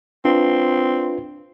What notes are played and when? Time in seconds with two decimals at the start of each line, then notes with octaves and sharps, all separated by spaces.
0.25 C4 D4 F4 B4